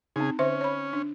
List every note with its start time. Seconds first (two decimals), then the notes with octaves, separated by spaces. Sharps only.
0.16 C#3 C4 D#4 G#4
0.39 D3 C#4 C5 E5
0.61 C#5 B5
0.93 D4